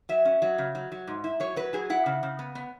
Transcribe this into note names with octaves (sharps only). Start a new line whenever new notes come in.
F#3 E5
C#4
F#3
C#3
F#3
F#3
G#2
E4
F#3 C#5
F#3 B4
F#3 G#4
E4 F#5
C#3
C#3
B3
B3